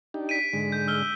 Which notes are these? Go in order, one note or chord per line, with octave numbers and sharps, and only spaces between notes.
D4 D#4 G4
B6 D7 D#7
G#2 D3 G#3
G6
E6 F6 G7